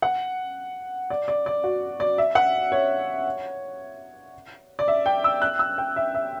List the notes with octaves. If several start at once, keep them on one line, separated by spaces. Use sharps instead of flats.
F#5
D5
D5
D5
F#4
D5
E5
F#5
C#5
D5
E5
G5
E6
F#6
E6
G5
E5
E5